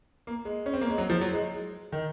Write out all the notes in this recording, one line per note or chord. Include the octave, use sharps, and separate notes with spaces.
A#3
G#3
C#4
C4
A#3
G#3
F#3
F3
F#3
G#3
D#3